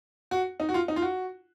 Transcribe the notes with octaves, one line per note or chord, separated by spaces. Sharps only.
F#4
D#4
F#4
F4
D#4
F4
F#4